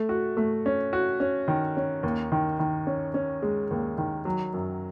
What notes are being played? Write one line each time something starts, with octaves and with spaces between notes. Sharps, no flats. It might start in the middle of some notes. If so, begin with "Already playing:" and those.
Already playing: A3
F#4
A3
C#4
F#4
C#4
D#3
C#4
D#2
D#3
D#3
C#4
C#4
G#3
D#2
D#3
F#3
F#2